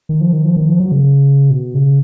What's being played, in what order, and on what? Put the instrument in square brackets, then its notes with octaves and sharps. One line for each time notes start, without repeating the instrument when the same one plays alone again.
[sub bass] D#3
F3
D#3
F3
D#3
F3
F#3
C#3
B2
C#3